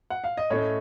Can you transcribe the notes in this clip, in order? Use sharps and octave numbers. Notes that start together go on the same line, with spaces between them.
F#5
F5
D#5
A2 A3 C#4 C#5
D#5